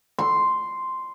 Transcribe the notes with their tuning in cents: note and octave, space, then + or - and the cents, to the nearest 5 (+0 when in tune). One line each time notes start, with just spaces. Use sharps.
C6 -5